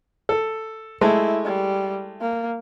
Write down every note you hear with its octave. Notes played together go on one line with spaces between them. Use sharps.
A4
G#3 A3 E4
G3
A#3